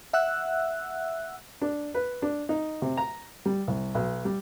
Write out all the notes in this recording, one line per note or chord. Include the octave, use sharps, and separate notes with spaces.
E5 F#5 E6 F#6
D4
B4
D4
D#4
C3
A#5
G3
C2
B1
G3